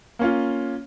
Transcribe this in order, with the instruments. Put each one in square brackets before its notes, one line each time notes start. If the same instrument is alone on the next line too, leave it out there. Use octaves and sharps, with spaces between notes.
[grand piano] A#3 C#4 F4